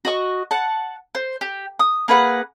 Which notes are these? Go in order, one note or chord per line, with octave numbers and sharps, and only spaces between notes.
F#4 D#5 C#6
F#5 A5
C5
G4
D#6
A#3 G#4 B4 F#5